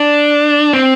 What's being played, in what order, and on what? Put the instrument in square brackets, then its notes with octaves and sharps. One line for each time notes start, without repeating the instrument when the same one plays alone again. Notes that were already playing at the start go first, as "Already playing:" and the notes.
Already playing: [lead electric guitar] D4
C4